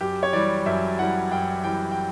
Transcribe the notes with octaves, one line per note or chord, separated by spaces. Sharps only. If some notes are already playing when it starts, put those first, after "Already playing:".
F#2 G4
C#5
E3 G3 D5
F#2 E5
E3 G3 F#5
F#2 G5
E3 G3 G5
G5